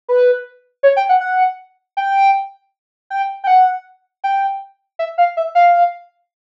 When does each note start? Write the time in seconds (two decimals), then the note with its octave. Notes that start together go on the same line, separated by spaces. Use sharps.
0.09 B4
0.83 C#5
0.97 G5
1.09 F#5
1.21 F#5
1.97 G5
3.10 G5
3.44 G5
3.47 F#5
4.24 G5
4.99 E5
5.18 F5
5.37 E5
5.55 F5